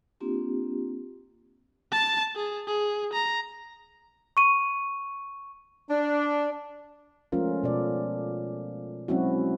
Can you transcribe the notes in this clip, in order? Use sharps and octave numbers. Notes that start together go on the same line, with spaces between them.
A#3 C4 D4 F4 G4
A5 A6
G#4
G#4
A#5
C#6 D#7
D4
F3 G#3 A3 C#4 F4 A#4
B2 A4 D5
F#3 G#3 C4 C#4 E4 F#4